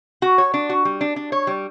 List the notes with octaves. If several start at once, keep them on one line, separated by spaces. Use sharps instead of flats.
F#4
C#5
D4
F#4
G3
D4
D4
C#5
G3